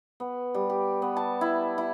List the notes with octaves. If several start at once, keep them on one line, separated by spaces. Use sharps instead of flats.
B3
G3
G4
B3
A5
E4
E4